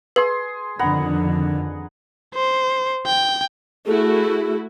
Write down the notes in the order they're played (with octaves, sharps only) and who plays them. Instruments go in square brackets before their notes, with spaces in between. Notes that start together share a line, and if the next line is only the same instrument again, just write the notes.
[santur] G#4 C6 [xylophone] B4
[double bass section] F2 D3 D#3 [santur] B3 F#5 A#5
[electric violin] C5
G5
[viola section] A3 E4 F#4 [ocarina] G#4